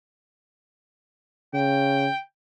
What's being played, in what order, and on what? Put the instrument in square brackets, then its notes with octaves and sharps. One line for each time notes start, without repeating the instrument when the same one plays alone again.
[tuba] C#3 [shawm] G5